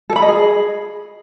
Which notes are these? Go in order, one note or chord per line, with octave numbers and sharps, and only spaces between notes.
A4
B5
D#5
G#4